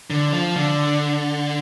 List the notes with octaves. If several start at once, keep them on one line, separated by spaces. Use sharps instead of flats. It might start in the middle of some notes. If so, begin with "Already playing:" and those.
D3
F3
D3